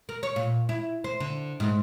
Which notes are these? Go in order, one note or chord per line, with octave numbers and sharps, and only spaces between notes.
A#4
C#5
A#2
E4
C5
D3
G#2